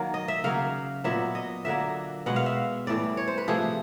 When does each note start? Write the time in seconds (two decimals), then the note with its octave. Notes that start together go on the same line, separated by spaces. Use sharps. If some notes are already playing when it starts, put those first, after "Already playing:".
Already playing: D#3 F#3 A#3
0.14 D#5
0.28 E5
0.44 C#3 F#3 A#3 F5
1.04 A#2 F#3 B3 E5
1.35 D#5
1.65 D3 F#3 A#3 E5
2.26 B2 G#3 B3 F#5
2.36 F5
2.46 E5
2.87 A2 E3 G3 D5
3.17 C#5
3.28 C5
3.38 B4
3.48 C3 F3 A3 G#4